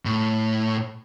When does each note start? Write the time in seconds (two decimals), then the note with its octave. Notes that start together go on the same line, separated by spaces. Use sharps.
0.05 A2